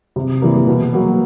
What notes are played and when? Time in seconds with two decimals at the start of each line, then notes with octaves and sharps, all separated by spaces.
0.16 C3
0.42 E3 G3 A#3
0.67 B2
0.94 F#3 A#3